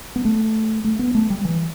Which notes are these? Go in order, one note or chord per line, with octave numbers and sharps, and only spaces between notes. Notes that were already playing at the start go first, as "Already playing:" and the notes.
B3
A3
A3
B3
A3
G3
E3